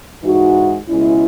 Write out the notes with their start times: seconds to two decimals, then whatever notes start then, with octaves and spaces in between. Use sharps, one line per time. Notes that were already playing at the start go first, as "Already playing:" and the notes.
0.22 G#2 E3 G#3 D#4 F#4
0.89 C#2 B2 G#3 C#4 E4